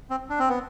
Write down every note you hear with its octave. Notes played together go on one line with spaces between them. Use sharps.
C4
D4
C4
B3